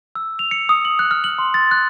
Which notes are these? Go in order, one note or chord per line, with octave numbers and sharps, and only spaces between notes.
E6
F7
C#7
D#6
F#7
F#6
F6
F#7
C6
A6
F#6